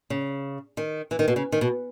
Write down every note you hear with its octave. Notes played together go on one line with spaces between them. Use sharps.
C#3
D#3
E3
D#3
B2
C#3
D#3
B2